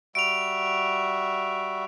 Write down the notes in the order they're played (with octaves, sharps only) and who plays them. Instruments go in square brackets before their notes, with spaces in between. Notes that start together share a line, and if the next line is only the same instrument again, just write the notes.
[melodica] G3 F#4 E5 [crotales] D7 F7